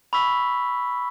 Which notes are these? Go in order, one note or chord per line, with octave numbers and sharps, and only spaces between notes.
B5 C#6 E6 B6